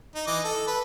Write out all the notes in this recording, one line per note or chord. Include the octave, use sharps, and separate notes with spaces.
D#4
E3 D#5 D6
A4
B4